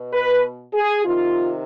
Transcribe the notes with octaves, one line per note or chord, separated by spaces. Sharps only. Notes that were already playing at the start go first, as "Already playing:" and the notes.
Already playing: B2
B4
G#4
C3 D#3 F4